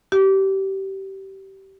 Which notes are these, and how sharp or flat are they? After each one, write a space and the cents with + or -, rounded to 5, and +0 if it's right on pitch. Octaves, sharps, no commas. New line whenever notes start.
G4 -25